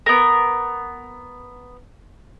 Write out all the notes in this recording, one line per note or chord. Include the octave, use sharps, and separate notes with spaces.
B3 A#4